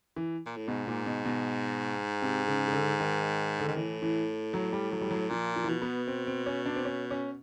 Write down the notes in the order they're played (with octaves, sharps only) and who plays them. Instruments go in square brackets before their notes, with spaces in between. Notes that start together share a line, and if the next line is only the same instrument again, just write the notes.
[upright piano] E3
[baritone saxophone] A#2
A2
[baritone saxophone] G#2 [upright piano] B2
[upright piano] A#2
B2
B2
C3
C#3
C#3
D3
D#3
D3
[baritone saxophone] G#2 [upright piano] D#3
[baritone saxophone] A2 [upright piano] E3
[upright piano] E3
F#3
G3
F#3
G3
F#3
[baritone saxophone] A#2 [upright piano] F3
[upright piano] F3
E3
[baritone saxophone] B2 [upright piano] F3
[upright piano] B3
C4
C4
C#4
D4
C4
C#4
C#4